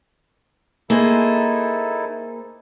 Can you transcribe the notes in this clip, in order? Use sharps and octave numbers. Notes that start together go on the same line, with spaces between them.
A#3 D#4 E4 G#4 A4 C5